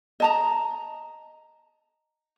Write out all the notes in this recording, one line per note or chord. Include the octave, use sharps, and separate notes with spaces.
D#5 A5 A#5